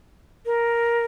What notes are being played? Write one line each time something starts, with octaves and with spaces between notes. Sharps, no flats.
A#4